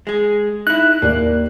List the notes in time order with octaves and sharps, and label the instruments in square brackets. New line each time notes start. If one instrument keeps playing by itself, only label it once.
[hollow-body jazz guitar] G#3 G#4
[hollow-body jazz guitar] D#4 E4 [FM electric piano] F#6
[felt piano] D#2 D5 [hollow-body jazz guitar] A#3